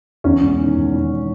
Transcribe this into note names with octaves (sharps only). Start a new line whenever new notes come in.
E2 C#4
E1
D#3
E1
E2